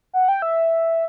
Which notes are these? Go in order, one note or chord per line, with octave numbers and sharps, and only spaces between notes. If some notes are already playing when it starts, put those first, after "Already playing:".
F#5
G5
E5